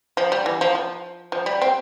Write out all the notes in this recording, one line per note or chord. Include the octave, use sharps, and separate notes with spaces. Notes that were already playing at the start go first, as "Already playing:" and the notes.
F3
G3
E3
F3
F3
F3
G3
C4